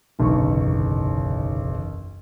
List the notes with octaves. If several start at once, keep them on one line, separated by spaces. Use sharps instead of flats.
F#1 B1 E2 D3 D#4 C#6